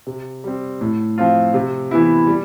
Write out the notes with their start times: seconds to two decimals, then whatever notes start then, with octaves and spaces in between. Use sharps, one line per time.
0.07 C3
0.44 G3 C4
0.81 A2
1.18 F3 C4 F4
1.54 C3
1.91 E3 B3 E4
2.27 G3